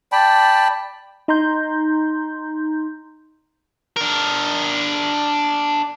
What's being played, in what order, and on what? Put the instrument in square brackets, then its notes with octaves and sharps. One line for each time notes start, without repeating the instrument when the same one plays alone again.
[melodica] D5 G5 A5 B5
[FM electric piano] D#4 A#5 C6 G6
[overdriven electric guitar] D4 A#4